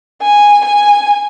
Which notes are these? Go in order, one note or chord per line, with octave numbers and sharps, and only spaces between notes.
G#5
G#5